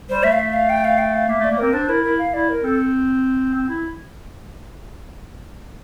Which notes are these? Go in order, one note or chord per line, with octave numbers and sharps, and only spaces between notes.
G3 C5
A3 E5
F5
E5
F5
G5
F5
G5
F5
A#3 E5
A3 D5
A#3
C4 A#4
D4 C5
E4 A#4
E4 A#4
F5
E4 D5
A#4
C4 A4
C4
E4